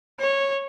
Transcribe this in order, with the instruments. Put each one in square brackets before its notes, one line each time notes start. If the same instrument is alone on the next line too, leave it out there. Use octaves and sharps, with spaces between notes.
[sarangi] C#5